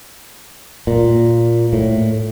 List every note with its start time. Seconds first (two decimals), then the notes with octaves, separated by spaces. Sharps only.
0.87 A#2
1.73 A2